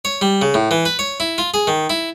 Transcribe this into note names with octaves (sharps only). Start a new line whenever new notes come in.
C#5
G3
C#3
A2
E3
B4
C#5
E4
F4
G#4
D#3
E4